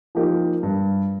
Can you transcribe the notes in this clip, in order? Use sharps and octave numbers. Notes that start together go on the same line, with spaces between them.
F3 A#3 D#4 G4
G2